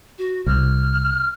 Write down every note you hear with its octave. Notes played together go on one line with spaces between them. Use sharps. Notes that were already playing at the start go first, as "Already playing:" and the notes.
F#4
C2 F6